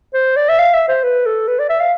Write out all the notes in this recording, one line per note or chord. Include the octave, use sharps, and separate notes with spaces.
C5
D5
E5
F5
E5
C5
B4
A4
B4
D5
E5
F5